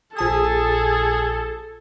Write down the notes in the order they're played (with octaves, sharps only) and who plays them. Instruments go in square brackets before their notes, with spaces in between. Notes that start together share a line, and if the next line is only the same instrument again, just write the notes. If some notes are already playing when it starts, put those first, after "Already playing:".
[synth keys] A#1 A5 D#6 [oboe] G#4 [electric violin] A4